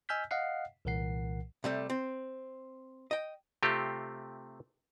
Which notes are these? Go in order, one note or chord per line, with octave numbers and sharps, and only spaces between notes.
D#5 G#5 E6 F6 G6 B6
D#5 F5 F#5 C7
C2 A#2 E3 A#4 F#5 C7
C3 G3 A3
C4
D#5 G5
C3 A3 C4 F4 G4